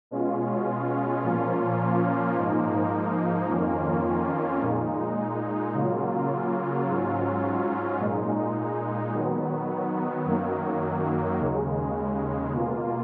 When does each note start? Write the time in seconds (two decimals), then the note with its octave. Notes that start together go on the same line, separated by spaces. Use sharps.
0.11 B2 G#3 C#4 F4
1.23 A#2 F3 A#3 C#4 F4
2.36 G#2 F3 A#3 D#4
3.49 F2 D#3 A#3 C#4 F4
4.61 A#2 G#3 D#4
5.74 C#3 F#3 A#3 F4
6.87 G#2 F#3 C#4 F4
8.00 A#2 G#3 D#4
9.12 D#3 F#3 B3
10.25 F#2 D#3 F#3 A#3
11.38 D#2 C#3 G#3
12.51 B2 A#3 F4